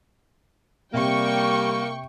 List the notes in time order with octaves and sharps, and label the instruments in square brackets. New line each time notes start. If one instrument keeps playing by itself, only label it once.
[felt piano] C3 [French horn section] G3 [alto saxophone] A#3 [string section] G5 C#6